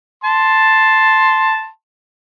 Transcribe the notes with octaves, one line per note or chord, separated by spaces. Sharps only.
A5 C6